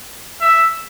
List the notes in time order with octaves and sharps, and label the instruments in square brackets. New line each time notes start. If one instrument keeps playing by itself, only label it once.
[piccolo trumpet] E5